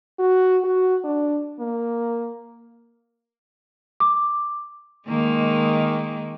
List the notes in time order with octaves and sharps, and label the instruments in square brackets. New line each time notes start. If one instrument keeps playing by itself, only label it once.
[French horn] F#4
F#4
D4
A#3
[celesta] D6
[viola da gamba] D#3 G#3 A#3